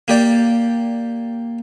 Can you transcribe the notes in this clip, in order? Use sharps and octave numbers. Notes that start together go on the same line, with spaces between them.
A#3 G4 D5